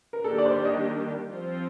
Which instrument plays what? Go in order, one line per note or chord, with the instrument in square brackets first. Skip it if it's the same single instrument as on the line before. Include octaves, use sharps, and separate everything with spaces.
[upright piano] A#4
[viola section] D#3 G3 A#3 D4 G4 [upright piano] A4
[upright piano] D5
C5
D5
D#5
[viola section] F3 C4 F4 C5